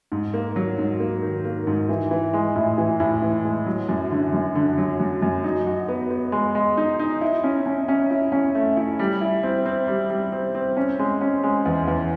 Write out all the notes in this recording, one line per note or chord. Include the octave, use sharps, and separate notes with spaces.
G#2
A#3
F#3
G#2
A#3
D#3
A#3
G#2
E3
E3
G#3
A2
E3
A2
E3
G#3
F#3
F#2
D3
F#2
D3
F#3
F#2
F#2
D#4
F#4
B3
B3
G#3
G#3
D#4
D#4
E4
C#4
C#4
C#4
E4
C#4
A3
E4
G3
E4
C4
C4
G3
G3
C4
C4
C#4
G#3
C#4
G#3
E2
E2